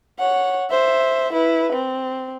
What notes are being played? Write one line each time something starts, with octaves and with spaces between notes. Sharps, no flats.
C#5 F#5
C5 E5
E4 B4
C4